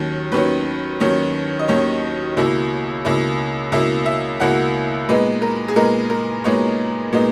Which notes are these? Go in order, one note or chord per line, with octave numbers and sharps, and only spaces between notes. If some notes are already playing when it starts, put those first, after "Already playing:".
Already playing: D#2 D#3 F#3 C#4
D#2 D#3 F#3 C#4 B4
D#2 D#3 F#3 C#4
D#5
D#2 D#3 F#3 C#4 C#5
C#2 B2 A#3 E4
C#2 B2 A#3 E4
C#2 B2 A#3 E4 E5
E5
C#2 B2 A#3 E4 F#5
A#2 G#3 B3 D#4 B4
A#4
G#4
A#2 G#3 B3 D#4 A#4
A#4
A#2 G#3 B3 D#4 C#5
A#2 G#3 B3 D#4